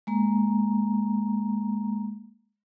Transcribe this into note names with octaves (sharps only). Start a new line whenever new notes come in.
G#3 A#3 A#5